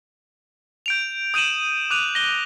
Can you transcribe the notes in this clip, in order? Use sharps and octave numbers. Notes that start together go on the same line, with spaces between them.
G6 D7 F7
D#6 G6 D#7 E7 F#7
D6 F#6 D#7 F7
A#6 G7